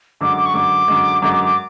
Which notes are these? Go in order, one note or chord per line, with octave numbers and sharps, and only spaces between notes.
F#2 D3 G#3 D6
D6
C#6
F#2 D3 G#3 D6
F#2 D3 G#3
F#2 D3 G#3 D6
D6
D6